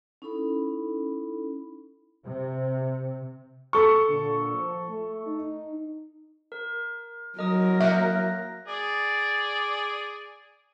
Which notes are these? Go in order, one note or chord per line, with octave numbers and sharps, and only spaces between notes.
C#4 D#4 E4 A4 B5
C3
A4 C#6
A#2 D3
F3
A3
D#4
A#4
F#3 A#4 D#5 D#6
A#3 E5 F#6 A#6
G#4 D5